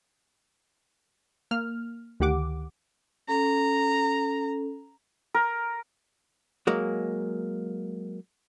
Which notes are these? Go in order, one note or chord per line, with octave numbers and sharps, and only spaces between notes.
A#3 F6
D2 D#3 G4 F#5 D6
C#4 A4 A#5
A#4
F#3 G#3 A#3